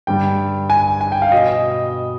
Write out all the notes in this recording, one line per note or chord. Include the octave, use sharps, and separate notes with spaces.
G2 D3 G3 G5
G#5
G#5
G5
F5
B2 D#5